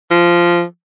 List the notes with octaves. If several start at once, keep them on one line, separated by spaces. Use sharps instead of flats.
F3